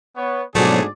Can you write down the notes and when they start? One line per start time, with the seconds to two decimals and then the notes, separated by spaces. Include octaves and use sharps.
0.15 B3 C#5
0.55 G#2 B2 D3 F3 F#3 A3 G#4 D5